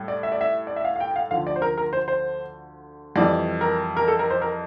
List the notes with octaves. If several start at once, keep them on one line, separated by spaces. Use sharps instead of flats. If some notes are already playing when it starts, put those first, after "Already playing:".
Already playing: A2 G3
D5
E5
D5
E5
D5
E5
F5
F5
G5
G5
F5
D2 D3 F3 F5
D5
C5
A#4
A#4
C5
C5
F2 E3 G3 D5
A#4
A#4
A4
A#4
C5
A#4